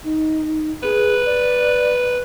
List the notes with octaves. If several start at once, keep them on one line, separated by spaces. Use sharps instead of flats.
D#4
G#4 B4
D5